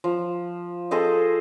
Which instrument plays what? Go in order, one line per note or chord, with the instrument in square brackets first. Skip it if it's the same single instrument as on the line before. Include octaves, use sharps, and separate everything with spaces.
[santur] F3
G#4 A4 C5 D#5